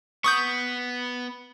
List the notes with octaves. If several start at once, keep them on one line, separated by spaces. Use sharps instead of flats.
B3 C#6 D#6 G6